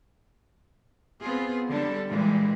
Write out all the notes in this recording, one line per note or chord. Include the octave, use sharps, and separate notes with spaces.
B3 C4 F4 G#4
D3 G3 D4 A4
A#2 E3 G3 G#3